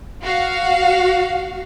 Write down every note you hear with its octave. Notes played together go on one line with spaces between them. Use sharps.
F#4 F5